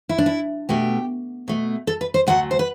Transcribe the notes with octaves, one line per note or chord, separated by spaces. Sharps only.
E4
D4
E4
B2 A3 G4
B2 A3
A4
B4
C5
D2 D3 F#3 A3 F#5
C5
B4